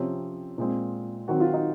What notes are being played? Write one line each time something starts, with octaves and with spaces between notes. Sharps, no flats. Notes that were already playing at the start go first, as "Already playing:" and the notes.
Already playing: C3 F3 C4 C#4
A#2 G#3 C4
D#3 F#3 C4 F#4
F4
D#4